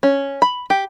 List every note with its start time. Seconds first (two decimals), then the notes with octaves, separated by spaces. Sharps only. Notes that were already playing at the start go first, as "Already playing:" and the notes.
0.03 C#4
0.42 B5
0.70 G4